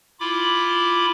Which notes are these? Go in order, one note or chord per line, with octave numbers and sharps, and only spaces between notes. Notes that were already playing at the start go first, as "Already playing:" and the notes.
E4 F4 B5 D6